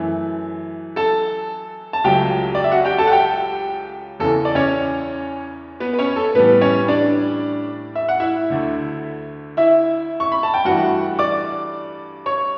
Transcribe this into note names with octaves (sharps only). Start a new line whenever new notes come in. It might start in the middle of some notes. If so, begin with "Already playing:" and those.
Already playing: F#2 E3 A3
A4 A5
A5
C#2 C#3 F#3 A3 G4 G5
D5
E5
F#4 F#5
G4 G5
A4 A5
F#5
G4 G5
E2 C#3 E3 A4
D5
C#4 C#5
B3 B4
B4
C#4 C#5
A4
A2 E3 G3 B3 B4
C#4 C#5
D4 D5
E5
F#5
E4 E5
D2 D3 A3
E4 E5
C#6
B5
A5
G5
G2 E3 A3 F#4 F#5
D5 D6
C#5 C#6